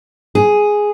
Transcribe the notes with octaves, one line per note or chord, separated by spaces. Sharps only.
G#4